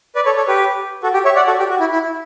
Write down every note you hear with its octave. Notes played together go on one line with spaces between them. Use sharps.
B4 D5
A4 C#5
A4 C#5
G4 B4
F#4 A4
G4
C#5 E5
D5 F#5
F#4 A4
G4
F#4
E4
E4